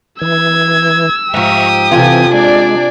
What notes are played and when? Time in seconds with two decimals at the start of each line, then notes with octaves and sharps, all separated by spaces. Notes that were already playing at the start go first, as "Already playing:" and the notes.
0.21 E3 E6 G#6
1.34 G#2 F3 G4 E5 A#5 C#6 D#6
1.91 C3 E3 C4 F4 A4 G#5
2.33 G#3 D4 D5 G#5